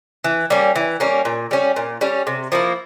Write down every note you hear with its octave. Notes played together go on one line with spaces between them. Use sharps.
E3
G3 A#3 C#4
E3
G3 A#3 C#4
A#2
G3 C#4
A#2
G3 C#4
C3
F3 A#3 E4